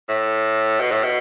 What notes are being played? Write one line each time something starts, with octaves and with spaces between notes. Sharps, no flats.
A2
B2
A2
B2